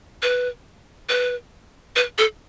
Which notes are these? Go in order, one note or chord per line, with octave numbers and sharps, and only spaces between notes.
B4
B4
B4
A4